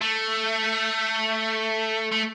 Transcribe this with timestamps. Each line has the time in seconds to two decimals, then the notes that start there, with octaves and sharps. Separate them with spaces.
0.01 A3
2.12 A3